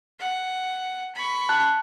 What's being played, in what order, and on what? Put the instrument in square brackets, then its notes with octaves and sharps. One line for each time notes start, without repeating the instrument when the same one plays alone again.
[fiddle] F#5
B5 C#6
[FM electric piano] A5 F#6